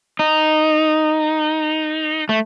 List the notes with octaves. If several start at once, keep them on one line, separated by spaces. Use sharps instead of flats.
D#4
A3